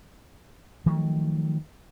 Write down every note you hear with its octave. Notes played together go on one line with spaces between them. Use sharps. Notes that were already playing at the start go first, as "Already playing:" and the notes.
D#3 F3 F#3 A3